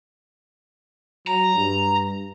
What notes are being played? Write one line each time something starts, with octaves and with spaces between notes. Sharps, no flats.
F#3 A#5
G2